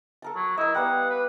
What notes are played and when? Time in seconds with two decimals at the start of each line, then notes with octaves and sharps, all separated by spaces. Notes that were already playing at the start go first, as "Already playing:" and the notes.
0.22 A4 A#4 A5
0.36 F#3
0.57 E4 A#4 D#5
0.75 G3 B3 F5 F#5
1.10 B4